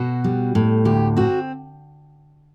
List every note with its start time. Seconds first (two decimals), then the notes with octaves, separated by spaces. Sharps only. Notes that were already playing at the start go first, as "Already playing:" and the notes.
Already playing: B2 F#4
0.24 G3
0.55 A2
0.85 D2 G4
1.16 C4 F#4